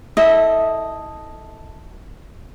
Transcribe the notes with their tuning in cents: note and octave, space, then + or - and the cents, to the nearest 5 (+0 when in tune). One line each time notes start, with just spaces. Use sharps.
E4 -25 A4 +0 D#5 +0